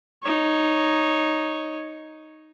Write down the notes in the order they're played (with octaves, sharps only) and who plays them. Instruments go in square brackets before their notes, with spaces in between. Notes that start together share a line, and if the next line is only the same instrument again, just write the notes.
[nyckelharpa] D#4 C#5